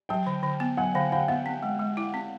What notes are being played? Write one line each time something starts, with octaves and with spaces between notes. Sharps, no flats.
F#3 G5 A5
D3
D3
B3
F#3 F#5 G#5
D3 F5 G5
D3 F5 G5
B3 E5 F#5
C4
G#3
G#3
E4
C4